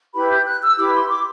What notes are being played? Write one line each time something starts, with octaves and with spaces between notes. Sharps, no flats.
E4 G4 B4 B5
G6
F#6
E6
E4 G4 B4 D6
C6
D6